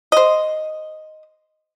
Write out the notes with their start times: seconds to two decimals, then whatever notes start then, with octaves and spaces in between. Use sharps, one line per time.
0.12 C5 D#5